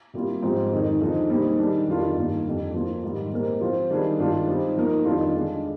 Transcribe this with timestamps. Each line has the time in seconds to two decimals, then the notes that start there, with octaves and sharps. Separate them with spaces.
0.14 C3 G3 A#3 F4
0.42 G#2 F3 C4 G4
0.72 F2 D#3 G#3 D#4
1.01 D3 F3 G#3 D#4
1.29 A#2 G3 C4 D#4
1.58 D#3 G3 D4 G#4
1.88 F2 D#3 G3 D4 F4
2.17 G2 D#3 A#3
2.45 F2 D3 G3
2.73 F3 A#3 F4
3.03 G#2 D#3 G3
3.32 A#2 G#3 C4 G4 A#4
3.61 F3 C4 F4
3.90 D#3 G3 D4 G#4
4.18 G2 D#3 G#3 D4 F4
4.47 G3 C4 D#4
4.77 F3 A#3 D#4 A#4
5.05 F2 D#3 G3 D4 F4
5.34 D3 G#3 D4 G#4